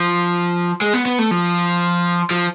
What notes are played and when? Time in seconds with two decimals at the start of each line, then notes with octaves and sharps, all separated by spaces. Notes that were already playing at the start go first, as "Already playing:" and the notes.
Already playing: F3
0.81 G#3
0.94 B3
1.06 B3
1.19 A3
1.31 F3
2.31 F3